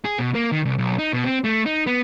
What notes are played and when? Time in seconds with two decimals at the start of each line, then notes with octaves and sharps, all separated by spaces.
0.05 G#4
0.19 B2
0.35 A#3
0.52 D#3
0.65 C2
0.79 B1
0.99 D#4
1.13 B2
1.24 C4
1.44 A3
1.66 D#4
1.87 B3